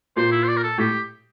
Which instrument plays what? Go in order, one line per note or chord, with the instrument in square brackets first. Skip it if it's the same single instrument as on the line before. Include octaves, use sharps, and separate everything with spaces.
[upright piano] A#2 [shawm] C5
[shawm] E4
C5
D5
A#4
A4
[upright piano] A2 [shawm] G4